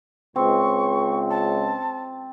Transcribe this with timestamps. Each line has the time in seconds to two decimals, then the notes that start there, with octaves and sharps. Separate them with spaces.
0.36 C#2 C4 C#6
1.30 A5